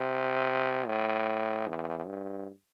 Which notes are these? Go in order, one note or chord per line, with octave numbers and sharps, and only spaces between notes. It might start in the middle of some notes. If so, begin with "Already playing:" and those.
Already playing: C3
A2
E2
G2